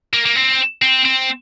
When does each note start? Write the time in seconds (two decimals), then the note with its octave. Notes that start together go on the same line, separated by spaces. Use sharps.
0.14 A#3
0.26 A#3
0.36 C4
0.82 C4
1.05 C4